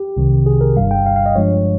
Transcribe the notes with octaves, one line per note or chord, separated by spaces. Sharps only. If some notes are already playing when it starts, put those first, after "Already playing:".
Already playing: G4
C2 C3 D#3
G#4
A#4
G1 G2 G3 F5
G5
F5
F5
D#5
G2 F3 G#3 C#5